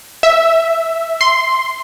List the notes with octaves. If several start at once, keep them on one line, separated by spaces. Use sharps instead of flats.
E5
C6